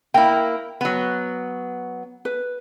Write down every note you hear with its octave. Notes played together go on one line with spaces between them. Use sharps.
A#3 E4 G5
F#3 B3
B4